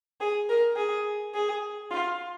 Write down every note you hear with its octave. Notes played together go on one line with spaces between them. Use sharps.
G#4
A#4
G#4
G#4
F4